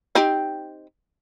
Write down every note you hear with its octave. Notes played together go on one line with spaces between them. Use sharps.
C4 D#4 G4